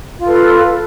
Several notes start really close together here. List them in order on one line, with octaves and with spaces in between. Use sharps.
F4 A4 B4